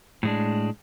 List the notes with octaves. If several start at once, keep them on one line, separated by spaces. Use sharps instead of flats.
A2 G#3 D4